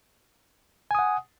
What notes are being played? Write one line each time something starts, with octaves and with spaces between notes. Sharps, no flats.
F#5 G#5 D#6